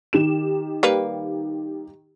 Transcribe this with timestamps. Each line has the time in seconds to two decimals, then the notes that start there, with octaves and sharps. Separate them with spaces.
0.13 D#3 G4 E7
0.83 G3 A#3 B4